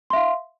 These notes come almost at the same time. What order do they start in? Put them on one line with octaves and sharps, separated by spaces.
C6 E5 F5